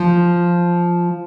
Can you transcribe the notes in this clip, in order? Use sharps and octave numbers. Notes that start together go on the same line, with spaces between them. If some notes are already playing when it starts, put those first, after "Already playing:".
Already playing: F3